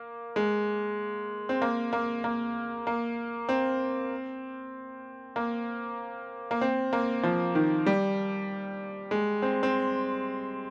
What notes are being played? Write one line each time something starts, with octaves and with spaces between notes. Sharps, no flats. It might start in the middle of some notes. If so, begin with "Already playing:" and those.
Already playing: A#3
G#3
C4
A#3
A#3
A#3
A#3
C4
A#3
A#3
C4
A#3
F3
D#3
G3
G#3
C4
C4